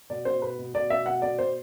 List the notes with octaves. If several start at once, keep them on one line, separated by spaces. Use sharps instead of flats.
B2 D5
B2 C5
B2 B4
B2
B2 D5
B2 E5
B2 F#5
B2 D5
B2 C5